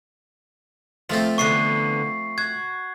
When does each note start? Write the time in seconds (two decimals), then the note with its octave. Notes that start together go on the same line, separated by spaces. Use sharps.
1.10 F3 A3 C4 F4
1.38 D3 E3 B3 C#6 C7
2.38 F#4 G#6